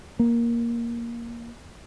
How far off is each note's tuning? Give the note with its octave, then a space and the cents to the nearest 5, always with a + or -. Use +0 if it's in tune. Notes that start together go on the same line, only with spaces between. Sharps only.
A#3 +10